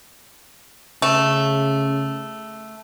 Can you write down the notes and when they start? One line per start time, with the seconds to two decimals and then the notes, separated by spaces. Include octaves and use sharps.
1.02 C#3 A3